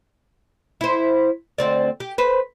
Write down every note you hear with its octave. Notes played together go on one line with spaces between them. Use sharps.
E4 C5
D2 C4 D5
G4
B4 C5